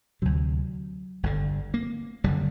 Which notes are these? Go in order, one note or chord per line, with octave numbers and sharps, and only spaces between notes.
D2 C3 F#3
G1 G2 D3
A#3
F#1 D3 G3